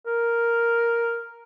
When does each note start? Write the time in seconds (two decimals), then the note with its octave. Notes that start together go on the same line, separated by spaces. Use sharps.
0.06 A#4